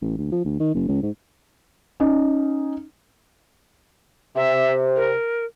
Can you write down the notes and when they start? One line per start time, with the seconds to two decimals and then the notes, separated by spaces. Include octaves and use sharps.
0.01 A1
0.18 D2
0.32 F3
0.45 D2
0.60 D#3
0.74 F#1
0.88 C#2
1.02 G#2
2.00 C#4 D#4
4.36 C3 E5
4.96 A#4